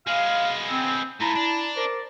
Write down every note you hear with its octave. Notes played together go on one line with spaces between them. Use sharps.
G#3 B3 F5
C4
A3 E4 F4 A5 A#5
D4
A#4 C5 D5